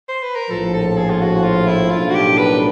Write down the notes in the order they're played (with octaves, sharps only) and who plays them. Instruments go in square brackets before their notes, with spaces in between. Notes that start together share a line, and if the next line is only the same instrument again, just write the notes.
[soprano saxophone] C5
B4
A#4
[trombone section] A#1 A2 F3 [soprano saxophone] A4
[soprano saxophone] A4
G#4
F4
F#4
F4
E4
[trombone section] B1 A2 F3 A#3 D4 [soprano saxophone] F4
[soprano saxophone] F#4
G4
B4